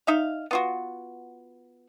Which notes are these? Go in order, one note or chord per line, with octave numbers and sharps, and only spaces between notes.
D#4 E5 F5
B3 F4 F#4